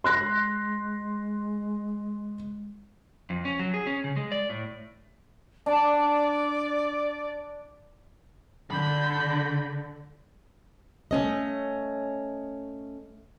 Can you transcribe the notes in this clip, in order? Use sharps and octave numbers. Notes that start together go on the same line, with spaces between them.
G#3 C6 F#6 A#6
F2
C#4
F#3
G#4
C#4
C#3
G#3
D5
A2
D4 D5
D3 B5 G6
A3 C#4 D#5